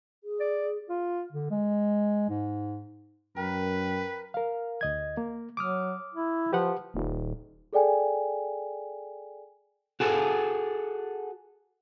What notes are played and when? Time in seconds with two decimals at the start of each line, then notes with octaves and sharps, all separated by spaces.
0.24 G#4
0.40 D5
0.89 F4
1.32 D3
1.50 G#3
2.30 G#2
3.36 F#2 A#4 B4 G5
4.34 A#4 F5
4.81 D2 D#5 G#6
5.17 A#3
5.57 F#3 D6 D#6 F6
6.14 E4
6.53 F3 G4 B4 F#5
6.94 D#1
7.73 G#4 A4 D5 G5 G#5
10.00 F#4 G#4 A4